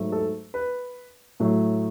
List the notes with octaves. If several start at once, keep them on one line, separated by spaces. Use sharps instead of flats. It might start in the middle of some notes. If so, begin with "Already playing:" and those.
Already playing: G#2 F#3 A3
A4
B4
A2 F#3 A3